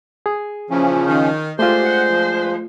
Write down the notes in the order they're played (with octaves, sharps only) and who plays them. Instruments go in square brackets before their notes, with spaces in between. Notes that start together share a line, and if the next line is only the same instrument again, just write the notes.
[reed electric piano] G#4
[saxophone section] A#2 E3 [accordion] C#3 F3 C#4
[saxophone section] D#3
[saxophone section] G#3 D4 C5 [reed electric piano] A3 F4 [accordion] G4
[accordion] F#5
F3